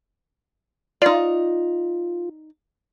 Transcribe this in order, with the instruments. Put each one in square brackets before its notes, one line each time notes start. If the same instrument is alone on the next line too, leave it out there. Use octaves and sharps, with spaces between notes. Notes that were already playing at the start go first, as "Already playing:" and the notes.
[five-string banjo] D#4 D5 [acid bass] F4